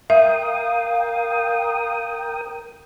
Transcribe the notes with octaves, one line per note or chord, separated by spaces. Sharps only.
A#4 E5 F5 G5 D#6